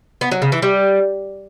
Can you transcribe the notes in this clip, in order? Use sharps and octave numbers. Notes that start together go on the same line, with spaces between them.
B3
F#3
C#3
E3
G3